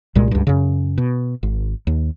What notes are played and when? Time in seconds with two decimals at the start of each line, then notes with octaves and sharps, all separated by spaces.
0.15 C2 A#2 G#3
0.31 C#2 G2
0.47 F#2 C#3
0.98 B2
1.43 G#1
1.87 D#2